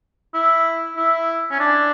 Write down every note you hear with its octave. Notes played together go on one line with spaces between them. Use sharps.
E4
E4
C#4
D4